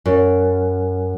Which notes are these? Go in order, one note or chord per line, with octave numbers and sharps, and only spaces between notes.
F#2